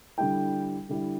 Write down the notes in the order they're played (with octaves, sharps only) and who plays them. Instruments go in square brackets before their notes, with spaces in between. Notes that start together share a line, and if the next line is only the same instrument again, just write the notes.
[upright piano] D3 G3 E4 G5
D3 G3 E4